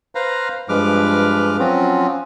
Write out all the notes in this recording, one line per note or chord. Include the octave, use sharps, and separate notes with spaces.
B4 C5 F5 A#5
G2 F3 G#3 B4 D6 F6
F3 F#3 C4 C#4 F4 F#4